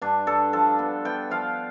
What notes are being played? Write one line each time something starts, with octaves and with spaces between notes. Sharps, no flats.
G2 D4
G2 A4
F3 A4
B3
B3 G5
F3 F5